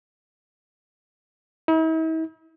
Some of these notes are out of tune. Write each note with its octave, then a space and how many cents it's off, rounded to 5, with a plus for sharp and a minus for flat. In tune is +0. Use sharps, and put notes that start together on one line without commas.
E4 -45